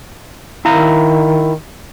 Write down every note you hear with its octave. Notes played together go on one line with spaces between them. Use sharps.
D#3 E4 F5 A#5